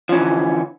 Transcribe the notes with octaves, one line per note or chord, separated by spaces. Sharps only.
D3 E3 F3 C#4